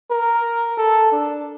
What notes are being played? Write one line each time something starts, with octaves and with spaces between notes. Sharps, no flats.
A#4
A4
D4